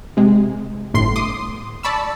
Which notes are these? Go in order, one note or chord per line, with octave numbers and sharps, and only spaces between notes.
C3 G#3
G1 A2 C6 C7
C6 D6 D#6
D5 A5 B5 C#6 E6